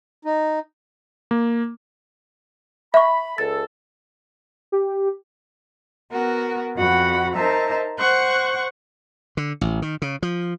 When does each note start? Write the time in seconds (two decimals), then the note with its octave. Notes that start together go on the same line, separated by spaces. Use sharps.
0.25 D#4
1.31 A#3
2.94 E5 B5 C#6
3.38 C#2 A4 A6
4.72 G4
6.11 B3 F#4 A#4
6.76 F2 F#4 F#5 B5
7.35 D#4 A#4 C5 E5 A5 A#5
7.99 C5 F#5 C#6 F#6
9.37 D3
9.61 A1
9.82 D#3
10.02 C#3
10.22 F3